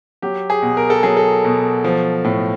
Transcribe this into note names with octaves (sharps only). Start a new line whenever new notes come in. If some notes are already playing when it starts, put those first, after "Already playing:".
F#3 G4
G#4
B2
A#4
A4
F#3 G#4
A4
B2
F3
A2